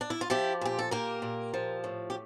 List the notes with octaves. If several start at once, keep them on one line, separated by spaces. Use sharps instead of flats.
D4
E4
F4
F3 E4 G4
A#2 G4
A4
A#3 G4 A#4
A#2
F3
A2
G4